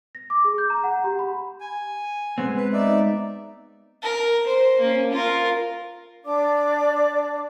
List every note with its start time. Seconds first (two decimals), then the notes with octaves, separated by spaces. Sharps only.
0.15 A#6
0.30 D6
0.44 G#4
0.58 G6
0.70 A#5
0.84 F#5
1.04 G4
1.19 B5
1.61 G#5
2.38 G#3 B3 C4
2.57 B4
2.73 D#4 D5 E5
4.03 A#4
4.46 C5
4.80 A#3 C#4
5.12 F4 A#4
6.24 D4 D5 D6